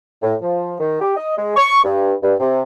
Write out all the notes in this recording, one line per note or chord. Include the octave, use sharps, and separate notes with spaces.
A2
F3
D#3
G4
D#5
G#3
C#6
G2
G2
C3